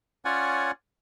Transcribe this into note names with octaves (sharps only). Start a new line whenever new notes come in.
C#4 F4 C#5 D5 F#5 G#5